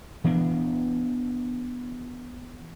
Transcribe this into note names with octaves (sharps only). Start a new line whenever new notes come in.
E3 B3 D4